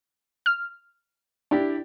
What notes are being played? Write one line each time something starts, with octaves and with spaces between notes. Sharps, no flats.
F6
D4 E4 G4